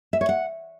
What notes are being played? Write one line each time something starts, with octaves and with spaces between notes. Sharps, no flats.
E5
C#5
F#5